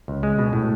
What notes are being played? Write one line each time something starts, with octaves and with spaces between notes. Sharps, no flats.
C#2
G#3
B2
A2